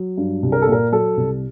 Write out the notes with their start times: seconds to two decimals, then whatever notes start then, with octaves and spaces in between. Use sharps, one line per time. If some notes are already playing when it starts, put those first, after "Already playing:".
Already playing: F#3
0.17 G2
0.43 C2
0.52 A#4
0.62 A4
0.67 A#2 A#4
0.92 F#3 A4
1.17 C2